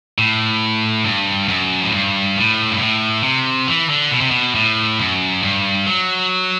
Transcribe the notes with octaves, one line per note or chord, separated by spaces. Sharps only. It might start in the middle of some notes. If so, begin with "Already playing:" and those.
A2
G2
F#2
A2
G2
A2
G2
A2
C3
E3
D3
B2
C3
B2
A2
F#2
G2
F#3